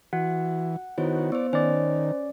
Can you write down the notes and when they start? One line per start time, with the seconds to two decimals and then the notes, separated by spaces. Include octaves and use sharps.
0.13 E3 F#4 F#5
0.98 D#3 B3 E4 F#4 C5 C#5
1.32 B3 C5 D5
1.53 D#3 C#4 C5 D5